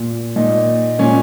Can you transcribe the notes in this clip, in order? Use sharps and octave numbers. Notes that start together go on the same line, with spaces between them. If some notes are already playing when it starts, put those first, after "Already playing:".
Already playing: A#2
A#2 D#4
A#2 C#4